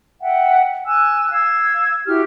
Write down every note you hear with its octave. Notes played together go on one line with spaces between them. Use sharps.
E5 F#5 G5
G#5 E6 F#6
F5 E6 G#6
E4 F#4 G4 F6